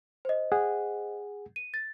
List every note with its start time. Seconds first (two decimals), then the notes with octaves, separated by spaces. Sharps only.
0.25 C5 D#5
0.52 G#4 F#5
1.56 D#7
1.74 A6